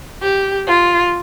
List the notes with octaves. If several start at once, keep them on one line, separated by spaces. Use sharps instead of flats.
G4
F4